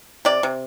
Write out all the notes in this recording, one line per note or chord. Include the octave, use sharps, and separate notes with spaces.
C3 D5
C3